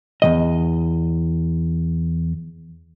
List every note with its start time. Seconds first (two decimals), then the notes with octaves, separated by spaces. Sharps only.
0.22 E2 D#3 D#5